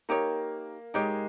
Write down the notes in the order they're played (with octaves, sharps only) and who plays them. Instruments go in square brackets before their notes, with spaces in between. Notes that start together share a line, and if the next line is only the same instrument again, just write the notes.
[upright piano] A#3 [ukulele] D#4 G4 C#5
[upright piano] G#3 [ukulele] D#4 G4 C#5